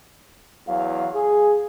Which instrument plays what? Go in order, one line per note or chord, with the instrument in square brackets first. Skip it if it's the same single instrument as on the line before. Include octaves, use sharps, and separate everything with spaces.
[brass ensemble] E2 E3 F#3 F5
G#4